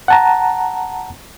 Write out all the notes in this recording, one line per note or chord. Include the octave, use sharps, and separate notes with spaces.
F#5 A5 A#5